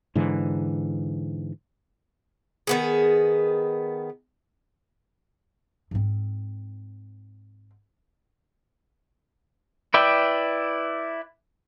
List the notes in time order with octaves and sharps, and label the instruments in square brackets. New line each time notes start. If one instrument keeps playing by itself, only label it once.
[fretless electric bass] G#2 D3 E3
[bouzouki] D#3 B3 G#4
[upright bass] G#2 C4
[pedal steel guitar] E4 B4 D5 E5 G5